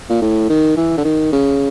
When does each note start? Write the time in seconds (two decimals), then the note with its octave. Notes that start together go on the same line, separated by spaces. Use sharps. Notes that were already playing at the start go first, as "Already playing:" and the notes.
0.09 A#2
0.22 A2
0.50 D#3
0.77 E3
0.98 D3
1.05 D#3
1.33 C#3